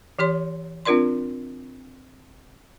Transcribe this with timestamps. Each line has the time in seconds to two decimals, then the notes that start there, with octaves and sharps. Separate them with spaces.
0.19 E3 G4 C#5 C6
0.85 C4 D4 F4 A#4 D5 C6